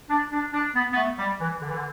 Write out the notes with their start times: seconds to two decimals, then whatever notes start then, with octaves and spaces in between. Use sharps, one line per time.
0.09 D4
0.31 D4
0.53 D4
0.75 B3
0.93 B3
0.96 A3
1.18 G3
1.40 E3
1.61 D3
1.68 E3
1.75 D3